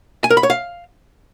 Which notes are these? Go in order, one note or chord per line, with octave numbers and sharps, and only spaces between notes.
G#5
A#4
B5
C#5
F5